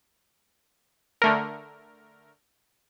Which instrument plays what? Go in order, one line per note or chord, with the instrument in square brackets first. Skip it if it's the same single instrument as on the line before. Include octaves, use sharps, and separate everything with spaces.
[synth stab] D3 A3 A#4